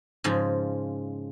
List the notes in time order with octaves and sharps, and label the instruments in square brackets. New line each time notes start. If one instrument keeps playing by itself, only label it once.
[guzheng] G#2 C#3 F3